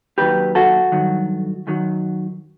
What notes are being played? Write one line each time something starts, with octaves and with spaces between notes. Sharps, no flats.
D#2 D#3 F#3 G4 B4
F#4 A4
G2 D#3 F#3
F#2 D#3 F#3